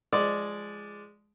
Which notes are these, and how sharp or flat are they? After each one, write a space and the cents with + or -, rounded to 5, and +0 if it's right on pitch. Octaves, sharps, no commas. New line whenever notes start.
F3 -15 G#3 +0 D5 +0